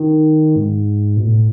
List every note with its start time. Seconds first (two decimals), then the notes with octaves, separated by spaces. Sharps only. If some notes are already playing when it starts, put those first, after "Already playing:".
Already playing: D#3
0.56 G#2
1.17 B2
1.24 A2